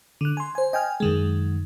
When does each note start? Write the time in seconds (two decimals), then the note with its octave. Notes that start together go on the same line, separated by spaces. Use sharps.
0.21 D3 F#6
0.37 G#5 C6
0.55 C5 G#5
0.73 D#5 G5 G#5 F6
1.00 F#2 D#3 G#3